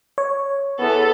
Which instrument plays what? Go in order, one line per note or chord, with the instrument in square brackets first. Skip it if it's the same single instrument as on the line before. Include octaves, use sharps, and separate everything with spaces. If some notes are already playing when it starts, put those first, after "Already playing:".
[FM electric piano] C#5
[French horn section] E2 B3 [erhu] A4